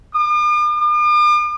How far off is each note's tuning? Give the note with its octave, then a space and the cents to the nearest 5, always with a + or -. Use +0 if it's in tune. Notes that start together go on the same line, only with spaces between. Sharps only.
D6 +45
D6 +45